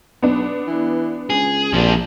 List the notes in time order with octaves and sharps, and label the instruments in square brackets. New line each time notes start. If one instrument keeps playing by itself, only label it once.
[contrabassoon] B1 [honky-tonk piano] B3 D4
[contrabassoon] E3
[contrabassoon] C#2 [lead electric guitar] G#4
[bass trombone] A#1 [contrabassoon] C3 [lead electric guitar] F3 D4